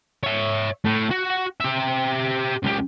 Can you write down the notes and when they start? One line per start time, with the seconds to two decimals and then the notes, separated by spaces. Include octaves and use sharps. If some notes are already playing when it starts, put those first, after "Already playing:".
0.23 C#5 E5
0.84 A2
1.11 F#4
1.60 G4 E5
2.63 C#2 G4